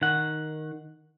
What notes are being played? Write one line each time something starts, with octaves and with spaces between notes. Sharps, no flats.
D#3 F#5